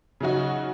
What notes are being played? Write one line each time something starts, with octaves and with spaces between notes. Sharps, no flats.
C#3 F#3 D#4 F#4